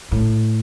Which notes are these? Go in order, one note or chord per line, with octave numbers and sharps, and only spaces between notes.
A2